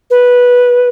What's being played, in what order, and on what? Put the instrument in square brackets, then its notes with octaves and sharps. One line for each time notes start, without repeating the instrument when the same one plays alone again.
[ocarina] B4